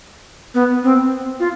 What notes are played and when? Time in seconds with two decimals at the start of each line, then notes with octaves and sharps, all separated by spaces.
0.54 B3
0.84 C4
1.40 F4